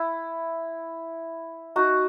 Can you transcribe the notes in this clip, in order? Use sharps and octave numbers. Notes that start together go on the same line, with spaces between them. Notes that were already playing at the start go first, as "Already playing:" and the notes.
Already playing: E4
D#4 F#4